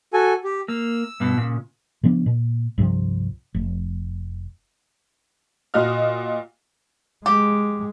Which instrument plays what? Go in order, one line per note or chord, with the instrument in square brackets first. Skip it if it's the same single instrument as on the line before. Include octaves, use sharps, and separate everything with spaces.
[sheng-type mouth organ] F#4 A4 G#5
G4
[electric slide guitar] A#3 [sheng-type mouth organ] E6
[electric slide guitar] G2 B2
A#2 C#3
[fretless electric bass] C#3 F3 B3 D4
A#2
C2 G2 C3 F3
F1
[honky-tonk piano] A#2 F#4 D#5 F6
[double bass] G#3 [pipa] G4